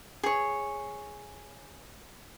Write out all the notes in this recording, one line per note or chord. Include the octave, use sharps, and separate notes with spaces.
G#4 C#5